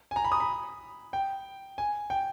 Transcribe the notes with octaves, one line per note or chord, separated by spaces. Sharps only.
G#5
A#5
B5
D#6
B5
G5
G#5
G5